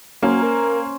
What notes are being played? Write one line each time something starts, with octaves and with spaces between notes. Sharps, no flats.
F#3 A#3 C#4 C5
A#4